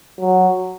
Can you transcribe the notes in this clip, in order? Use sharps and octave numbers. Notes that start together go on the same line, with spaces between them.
F#3